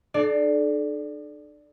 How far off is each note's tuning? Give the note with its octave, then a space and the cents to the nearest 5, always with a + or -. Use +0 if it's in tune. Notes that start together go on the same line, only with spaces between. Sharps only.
D4 +45 A4 -30 D5 +0